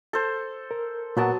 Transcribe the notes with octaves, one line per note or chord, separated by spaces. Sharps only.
A4 C5
A#4
A#2 F#3 B3 A#4 F#5 A5